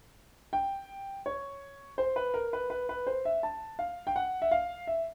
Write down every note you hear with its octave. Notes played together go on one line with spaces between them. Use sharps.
G5
C#5
C5
B4
A#4
B4
B4
B4
C5
E5
A5
F5
G5
F#5
E5
F5
E5